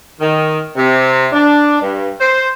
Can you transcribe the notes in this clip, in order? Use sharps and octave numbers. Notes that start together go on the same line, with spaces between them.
D#3
C3
D4
G2
C5